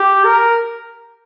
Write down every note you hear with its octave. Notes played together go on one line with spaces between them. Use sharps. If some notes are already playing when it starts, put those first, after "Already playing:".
Already playing: G4
A#4